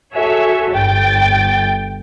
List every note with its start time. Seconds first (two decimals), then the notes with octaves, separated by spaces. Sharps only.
0.15 F#4 G#4 A4 C#5 E5
0.73 G1 G5 A6